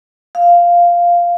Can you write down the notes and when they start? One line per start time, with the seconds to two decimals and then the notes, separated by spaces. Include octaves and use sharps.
0.35 F5